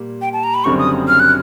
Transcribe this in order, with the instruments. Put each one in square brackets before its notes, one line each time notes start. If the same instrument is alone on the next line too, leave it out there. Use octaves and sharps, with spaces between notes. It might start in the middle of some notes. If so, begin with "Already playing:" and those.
Already playing: [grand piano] A#2 G3 A#3
[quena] G5
A5
A#5
B5
[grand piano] F#1 F#2 D3 G3 C4 [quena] C#6
[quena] D#6
F6
F#6